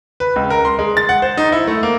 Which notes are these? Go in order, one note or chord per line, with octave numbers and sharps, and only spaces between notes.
B4
C#2
A#4
C6
G#3
A6
F#5
C5
D#4
E4
A3
A#3